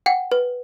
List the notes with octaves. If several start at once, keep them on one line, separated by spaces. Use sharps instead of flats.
F#5 G5
B4